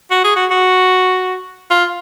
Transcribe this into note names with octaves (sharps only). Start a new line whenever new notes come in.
F#4
G#4
F#4
F#4
F4